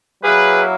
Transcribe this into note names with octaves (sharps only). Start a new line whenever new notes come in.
F#3 A#3 E4 G#4 B4